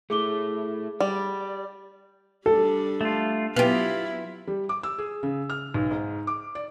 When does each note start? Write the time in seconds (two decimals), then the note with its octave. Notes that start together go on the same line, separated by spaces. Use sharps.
0.10 A3 E4 G#4 D6 G7
1.00 G3 D5
2.46 G3 D4 A4
3.01 A3 F4
3.56 F#3 B3 E4 F4 G4 F5
4.47 G3
4.69 D6
4.83 E6
4.98 G#4
5.23 C#3
5.50 F6
5.74 B1
5.91 G#2
6.27 D6
6.55 D5